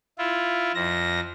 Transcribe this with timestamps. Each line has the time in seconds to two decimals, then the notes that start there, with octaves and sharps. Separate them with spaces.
0.18 E4 F4
0.75 F2 A#6